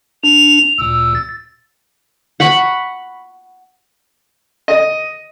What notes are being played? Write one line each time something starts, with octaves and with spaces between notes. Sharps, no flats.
D4 F7
D2 A#2 E6
A6
F#5 B5 C#6
D#5